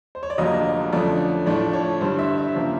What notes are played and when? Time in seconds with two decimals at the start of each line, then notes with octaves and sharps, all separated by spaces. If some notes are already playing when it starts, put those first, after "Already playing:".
0.15 C5
0.23 C#5
0.30 D5
0.38 F1 F2 D3 F#3 A#3 D#5
0.93 F2 D3 F3 A3 C#4 D5
1.46 A2 F3 A3 D4 D5
1.73 C#5
2.01 G2 D3 G3 C5
2.19 E5
2.38 E5
2.55 C#3 F3 A#3 E5